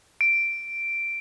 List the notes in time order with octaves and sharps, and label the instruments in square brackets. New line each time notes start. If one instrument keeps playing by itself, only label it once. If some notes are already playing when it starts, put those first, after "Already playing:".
[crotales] D7